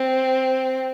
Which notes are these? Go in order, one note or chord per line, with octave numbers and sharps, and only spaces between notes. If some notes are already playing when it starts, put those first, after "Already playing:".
Already playing: C4